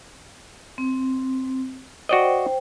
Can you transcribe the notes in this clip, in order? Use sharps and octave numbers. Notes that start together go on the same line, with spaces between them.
C4
F#4 C5 D5 D#5 G5